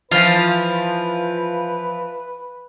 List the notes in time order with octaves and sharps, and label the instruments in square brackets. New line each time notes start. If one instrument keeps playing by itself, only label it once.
[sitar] E3 F3 [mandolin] F4 [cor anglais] B4